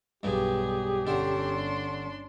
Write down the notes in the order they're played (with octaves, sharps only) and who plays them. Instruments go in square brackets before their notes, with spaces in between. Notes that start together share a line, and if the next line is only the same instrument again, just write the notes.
[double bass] B1 B2 [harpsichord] G2 [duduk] G4 [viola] G#4
[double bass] G1 C#4 [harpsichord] D3 [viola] D4 C6